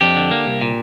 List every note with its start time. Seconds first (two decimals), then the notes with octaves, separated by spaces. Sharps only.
0.01 F2 D4 G4
0.16 D3
0.31 A#3
0.47 C2
0.62 A#2